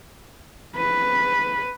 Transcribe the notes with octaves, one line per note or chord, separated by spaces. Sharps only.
B4